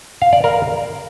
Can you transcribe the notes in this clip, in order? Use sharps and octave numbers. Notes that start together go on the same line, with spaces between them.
F5
D5
A#4